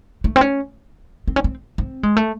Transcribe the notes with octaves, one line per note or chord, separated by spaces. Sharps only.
A3
C4
C#4
C4
C#4
C4
C4
G#3
A3